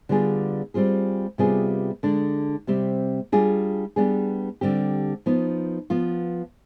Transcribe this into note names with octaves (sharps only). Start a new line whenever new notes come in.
D3 G3 B3 F4 G#4
G3 C4 F4 G#4
C3 G3 B3 F4 G#4
D3 G#3 D4
C3 G3 C4 G4
G3 D4 F4 G#4
G3 B3 D4 G#4
D3 G3 C4 G4
F3 B3 D#4
F3 B3 F4